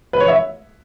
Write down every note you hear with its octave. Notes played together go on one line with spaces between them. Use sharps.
B4
C#5
E5